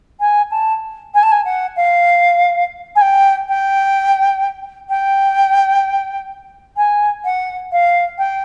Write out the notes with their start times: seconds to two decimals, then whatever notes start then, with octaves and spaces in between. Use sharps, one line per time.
0.20 G#5
0.51 A5
1.14 G#5
1.23 A5
1.31 G#5
1.45 F#5
1.76 F5
2.95 G#5
3.01 G5
3.48 G5
4.89 G5
6.77 G#5
7.24 F#5
7.72 F5
8.18 G5